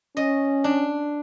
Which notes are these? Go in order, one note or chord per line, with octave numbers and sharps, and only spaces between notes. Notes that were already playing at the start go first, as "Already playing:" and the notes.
C#4 D#5
D4